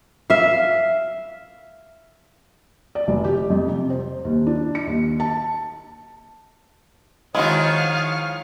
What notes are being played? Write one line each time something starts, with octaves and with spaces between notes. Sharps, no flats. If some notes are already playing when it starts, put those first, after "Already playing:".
E5 F5
D5
F1
G4
F2
C3
C5
D#2
D4
C#7
D#2
A5
D#3 F3 G#3 E4 F#4 C#5 F5 D#6